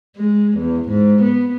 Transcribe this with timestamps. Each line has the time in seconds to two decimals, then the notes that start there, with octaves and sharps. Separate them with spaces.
0.16 G#3
0.57 E2
0.88 G#2
1.22 B3